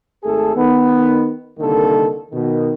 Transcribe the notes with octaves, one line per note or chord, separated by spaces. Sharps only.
G#1 A3 G#4 A4
D#3 B3
C2 D3 D#3 A#3 A4
B2 D#3